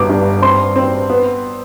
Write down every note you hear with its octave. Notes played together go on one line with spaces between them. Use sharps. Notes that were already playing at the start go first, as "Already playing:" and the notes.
Already playing: G1 B3 D6
G2
C4 C6
C4
B3